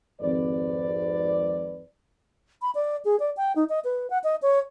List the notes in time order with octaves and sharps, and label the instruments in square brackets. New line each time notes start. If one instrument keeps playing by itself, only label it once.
[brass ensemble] G#1 F2 B4 D5
[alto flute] B5
D5
G#4
D5
G5
D#4
D#5
B4
F#5
D#5
C#5